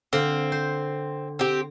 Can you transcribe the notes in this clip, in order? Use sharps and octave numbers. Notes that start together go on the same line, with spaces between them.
D3 C4 F5
C5
C4 G4